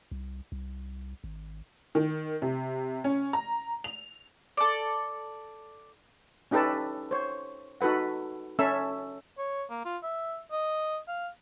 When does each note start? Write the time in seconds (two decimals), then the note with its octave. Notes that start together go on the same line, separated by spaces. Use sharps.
0.11 C2
0.52 C2
1.24 G#1
1.95 D#3
2.42 C3
3.04 C#4
3.33 A#5
3.84 F7
4.57 A4 D5
6.51 C#4 D#4 G4 A4 B4 A5
7.11 C5 C#5
7.81 D#4 F#4 A4 B4 F#5
8.59 C#4 A4 E5 E6
9.38 C#5
9.70 A#3
9.85 F4
10.03 E5
10.52 D#5
11.08 F5